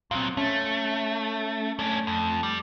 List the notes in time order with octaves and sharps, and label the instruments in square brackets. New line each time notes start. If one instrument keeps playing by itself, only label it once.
[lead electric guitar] A#2 F#3 [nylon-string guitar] C4 F5
[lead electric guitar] A3 [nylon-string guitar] C#4
[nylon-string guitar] A3 [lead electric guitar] C#4 D4
[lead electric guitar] F2
G3